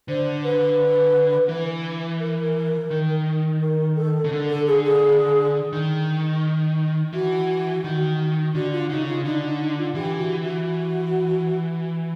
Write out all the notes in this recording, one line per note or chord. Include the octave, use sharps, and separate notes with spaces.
D3 C5
B4
E3
A#4
D#3
A#4
A4
C#3
D3
A4
G#4
G#4
D#3
E3 F#4
D#3
D3 F#4
F4
C#3 D#4
F4
D3 D#4
D#4
F4
E3 G4
F#4
F#4